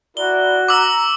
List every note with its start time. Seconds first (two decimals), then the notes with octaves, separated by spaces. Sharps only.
0.17 E4 F#4 A#4 D5 G7
0.68 A#5 D6 E6